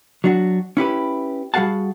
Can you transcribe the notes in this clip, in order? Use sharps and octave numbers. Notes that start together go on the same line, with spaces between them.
F#3 D4 F#4
C#4 E4 G4 B4
G3 F#4 G#4 F5 F#5 A5